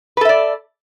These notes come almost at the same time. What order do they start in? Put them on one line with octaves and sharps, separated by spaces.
B4 A4 E5 D5